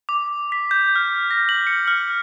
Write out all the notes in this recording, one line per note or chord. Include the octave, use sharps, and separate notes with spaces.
D6
B6
G6
F6
A#6
F#7
C#7
F6